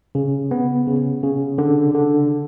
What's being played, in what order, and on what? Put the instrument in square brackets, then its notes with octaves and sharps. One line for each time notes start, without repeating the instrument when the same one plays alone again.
[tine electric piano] C#3
B3
C#3
C#3
D3
D3